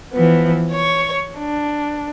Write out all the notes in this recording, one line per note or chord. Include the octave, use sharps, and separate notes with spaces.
E3 F3 B3
C#5 C#6
D4